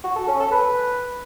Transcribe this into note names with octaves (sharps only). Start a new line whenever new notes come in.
F#4
A4
C#4
A4
B4